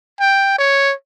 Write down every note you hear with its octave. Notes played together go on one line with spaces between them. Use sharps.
G5
C#5